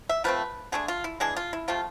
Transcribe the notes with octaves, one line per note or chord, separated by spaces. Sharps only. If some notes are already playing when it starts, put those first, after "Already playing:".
E5
F3 A3 C4 B4
D3 A3 D4 G#4
F4
E4
E3 G#3 D4 G#4
F4
E4
C3 F3 A3 F4